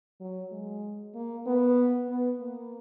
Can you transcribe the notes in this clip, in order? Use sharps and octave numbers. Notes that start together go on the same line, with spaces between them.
F#3
G#3
A#3
B3
B3
A#3